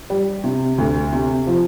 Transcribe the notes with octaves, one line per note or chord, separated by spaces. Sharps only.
G3
C3
D2
C3
F3